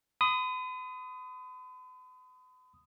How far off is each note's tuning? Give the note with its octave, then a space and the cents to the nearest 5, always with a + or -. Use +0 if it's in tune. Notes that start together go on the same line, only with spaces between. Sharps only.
B5 +45 D#6 +0